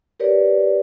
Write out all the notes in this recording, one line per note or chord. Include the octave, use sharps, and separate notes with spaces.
G4 A#4 B4 C#5 D5